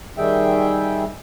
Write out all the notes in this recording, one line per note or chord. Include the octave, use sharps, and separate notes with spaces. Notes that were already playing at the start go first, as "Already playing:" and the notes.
D#3 G3 G#4 E5 G5